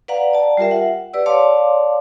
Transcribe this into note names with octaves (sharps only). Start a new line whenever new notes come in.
B4 D5 F5 F#5 A#5
D5 A5
G3 F4 G4 A#4 E5
F#5
G4 B4 D5 E6
C#5 D5 F5 A5 C6 D6